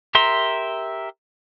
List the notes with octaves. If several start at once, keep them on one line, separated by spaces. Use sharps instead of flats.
G4 A#4 E5 A#5 C6